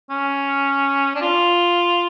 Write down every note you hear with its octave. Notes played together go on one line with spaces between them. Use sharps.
C#4
D4
F4